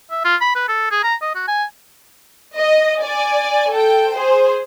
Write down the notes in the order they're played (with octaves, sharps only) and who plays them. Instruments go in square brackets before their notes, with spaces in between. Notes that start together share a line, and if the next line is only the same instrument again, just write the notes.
[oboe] E5
F4
B5
B4
A4
G#4
A#5
D#5
F#4
G#5
[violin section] D#5
D5 G#5
A4 G5
G#4 C5